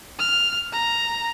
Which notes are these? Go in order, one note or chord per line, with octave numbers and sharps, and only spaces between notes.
F6
A#5